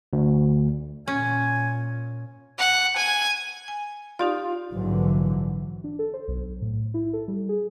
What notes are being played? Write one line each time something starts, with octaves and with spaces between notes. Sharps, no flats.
D2
A#2 C#4 G#5
F#5
G#5
G#5
D#4 F4 G4 D5
A#1 G#2 D3 E3 F#3
D4
A4
C5
B1
A2
E4
A4
G3
G#4